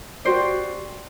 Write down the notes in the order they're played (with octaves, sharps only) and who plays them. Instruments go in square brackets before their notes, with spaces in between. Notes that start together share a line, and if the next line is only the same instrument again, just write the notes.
[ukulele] F#4 G4 C5 D5